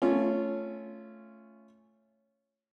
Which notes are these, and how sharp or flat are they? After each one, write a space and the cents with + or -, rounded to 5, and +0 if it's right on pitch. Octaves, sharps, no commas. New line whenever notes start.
A3 +0 C#4 +0 F4 -15